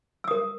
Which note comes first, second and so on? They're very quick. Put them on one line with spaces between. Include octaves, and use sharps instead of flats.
E6 D#6 A#4